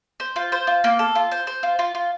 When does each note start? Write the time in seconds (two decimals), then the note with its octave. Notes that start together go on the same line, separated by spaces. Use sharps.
0.20 C5
0.36 F4
0.52 C5
0.67 F4
0.84 A#3
0.99 A4
1.15 F4
1.32 C5
1.47 C5
1.63 F4
1.79 F4
1.95 F4